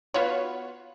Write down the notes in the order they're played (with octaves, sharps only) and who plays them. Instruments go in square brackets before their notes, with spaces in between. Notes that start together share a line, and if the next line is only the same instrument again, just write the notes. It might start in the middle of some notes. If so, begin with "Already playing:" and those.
[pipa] B3 F4 F#4 [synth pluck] C#5